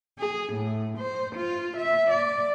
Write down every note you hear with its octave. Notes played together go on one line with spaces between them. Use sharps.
G#4
A2
C5
F4
E5
D5